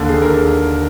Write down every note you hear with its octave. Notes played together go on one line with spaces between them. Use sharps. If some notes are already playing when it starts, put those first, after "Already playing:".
Already playing: D#2 D3
G#4
A#4